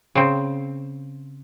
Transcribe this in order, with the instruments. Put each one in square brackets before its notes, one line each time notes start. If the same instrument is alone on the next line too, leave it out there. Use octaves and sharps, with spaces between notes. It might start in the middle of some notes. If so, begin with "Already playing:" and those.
[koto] C#3 C4